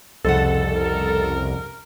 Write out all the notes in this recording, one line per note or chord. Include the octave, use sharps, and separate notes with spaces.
C2 F2 C#3 A4 F#5
A#4